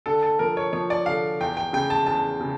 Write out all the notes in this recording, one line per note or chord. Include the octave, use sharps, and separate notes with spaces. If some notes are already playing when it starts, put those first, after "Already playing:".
D3 A4
A4
F3 A#4
C#5
F3 C#5
D5
D3 F5
E2 G5
G5
C#3 G5
A5
E2 A5
C#3